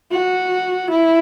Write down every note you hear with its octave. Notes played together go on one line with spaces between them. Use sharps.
F#4
E4